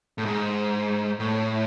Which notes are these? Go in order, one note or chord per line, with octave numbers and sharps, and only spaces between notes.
A2
G#2
A2